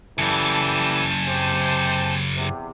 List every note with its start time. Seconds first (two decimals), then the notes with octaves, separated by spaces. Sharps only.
0.18 F#2 C#3 E3 G3 A4 G#5 A5 G6
1.27 C3 G4 C5
2.36 E2 C3